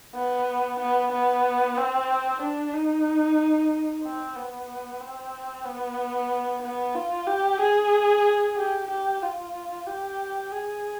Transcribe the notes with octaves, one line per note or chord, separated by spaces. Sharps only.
B3
B3
B3
C4
D4
D#4
C4
B3
C4
B3
B3
F4
G4
G#4
G4
G4
F4
G4
G#4